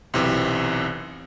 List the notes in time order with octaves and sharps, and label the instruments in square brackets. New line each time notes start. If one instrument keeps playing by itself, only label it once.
[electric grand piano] B1 F#2 C3 E3